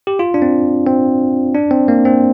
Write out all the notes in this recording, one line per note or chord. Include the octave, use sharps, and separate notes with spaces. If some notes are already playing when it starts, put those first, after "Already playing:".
G4
F4
D4
C4
C4
D4
C4
A#3
C4